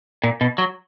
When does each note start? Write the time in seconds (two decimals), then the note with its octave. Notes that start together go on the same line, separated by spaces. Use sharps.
0.23 A#2
0.41 B2
0.58 F#3